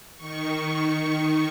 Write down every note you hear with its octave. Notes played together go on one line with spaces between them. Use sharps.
D#3 C#6